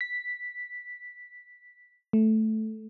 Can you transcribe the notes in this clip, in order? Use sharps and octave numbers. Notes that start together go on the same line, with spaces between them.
B6
A3